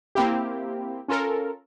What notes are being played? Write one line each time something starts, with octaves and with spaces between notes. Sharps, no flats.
A#3 C4 E4 G4
C#4 F4 A4 A#4